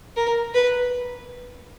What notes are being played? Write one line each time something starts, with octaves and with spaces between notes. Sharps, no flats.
A#4
B4